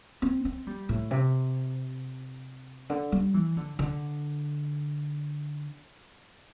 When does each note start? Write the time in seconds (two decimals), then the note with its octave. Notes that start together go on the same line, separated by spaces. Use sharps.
0.22 C4
0.45 C4
0.67 G3
0.89 A2
1.11 C3
2.89 D3
3.12 G3
3.34 E3
3.57 D3
3.79 D3